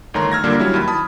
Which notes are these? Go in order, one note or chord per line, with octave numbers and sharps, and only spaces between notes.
G1 D#3 A3 C#5 A#5 C6
E6 F6 G#6 A#6
A#2 D3 G3 A#3 D4 G4
F#3 G3 C#4 E4
D#2 B5
A5 B5 D#6